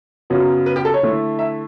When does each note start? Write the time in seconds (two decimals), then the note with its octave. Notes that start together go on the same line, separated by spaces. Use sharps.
0.30 F#2 C#3 F#3 B3
0.66 B4
0.76 G4
0.85 A4
0.94 C#5
1.03 D3 A3 E4
1.39 E5